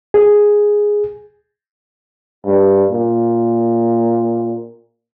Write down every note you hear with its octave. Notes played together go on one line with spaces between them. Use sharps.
G#4
G2
A#2